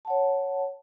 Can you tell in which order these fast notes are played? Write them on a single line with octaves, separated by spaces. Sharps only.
A5 F#5 C#5